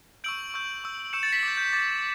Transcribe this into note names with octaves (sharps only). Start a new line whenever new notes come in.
C#6 E6 G6 D7 F#7
C#6 E6 G6
C#6 E6 G6
C#6 E6 G6 C#7 E7
A6 C#7
B6
D6 G6
G6
D6 G6 A6